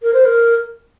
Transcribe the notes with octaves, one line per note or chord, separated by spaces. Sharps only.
A#4
C5
A#4